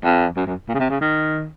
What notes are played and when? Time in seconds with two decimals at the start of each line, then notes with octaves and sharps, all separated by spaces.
0.04 F2
0.36 F#2
0.46 F#2
0.68 A#2
0.74 C#3
0.79 C3
0.89 C#3
1.01 D#3